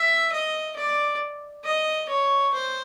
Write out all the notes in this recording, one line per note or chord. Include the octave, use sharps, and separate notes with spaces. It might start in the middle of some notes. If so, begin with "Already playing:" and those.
Already playing: E5
D#5
D5
D#5
C#5
C5